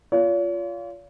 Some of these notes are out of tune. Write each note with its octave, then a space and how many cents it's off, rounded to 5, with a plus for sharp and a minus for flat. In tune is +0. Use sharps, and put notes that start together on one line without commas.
F4 -5 C#5 +45